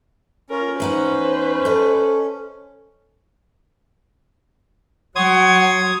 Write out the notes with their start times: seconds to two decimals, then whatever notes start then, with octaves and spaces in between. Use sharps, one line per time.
0.50 C#4 F4 A#4
0.80 E2 D#4 B4 C5 F#5
1.65 A4 D#5
5.16 F#3 C#5 F#5 C6 D#6 G#6